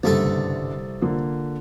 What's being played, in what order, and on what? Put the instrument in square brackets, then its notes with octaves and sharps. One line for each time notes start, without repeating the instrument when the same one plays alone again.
[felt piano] F#1 G2 D3 [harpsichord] C2 A3 A4
[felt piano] D3 A#3 F4